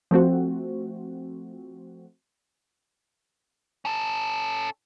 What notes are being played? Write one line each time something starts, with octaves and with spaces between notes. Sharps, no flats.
F3 A3 C4 F#4
C#4 A4